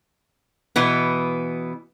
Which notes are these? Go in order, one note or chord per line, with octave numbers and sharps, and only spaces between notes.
B2 E3 B3